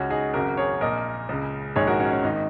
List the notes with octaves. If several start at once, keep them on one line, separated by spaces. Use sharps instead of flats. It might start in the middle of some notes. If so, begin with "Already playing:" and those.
Already playing: C#2 C#3 C#4 F#4
D#4 G#4
G#1 F#2 C#3 F#4 A#4
G#4 C#5
A#1 A#2 A#4 D#5
C#2 C#3
A#1 G#2 D#3 G#4 C#5
F#4 A#4
C#4 F#4
C#4
G#1 G#2 D#3 D#4